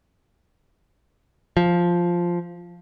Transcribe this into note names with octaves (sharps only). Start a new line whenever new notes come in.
F3